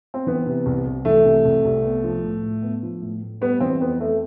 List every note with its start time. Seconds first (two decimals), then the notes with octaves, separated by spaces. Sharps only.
0.14 C4
0.27 E3 B3
0.46 C3
0.66 C2
0.86 C2
1.05 E3 A3
1.25 C3
1.45 C2
1.65 C2
1.84 B3
2.04 F3
2.23 A2
2.43 A2
2.62 B3
2.83 F3
3.02 A2
3.22 A2
3.41 G3 B3
3.60 E3 C4
3.81 F2 B3
4.00 A3 C4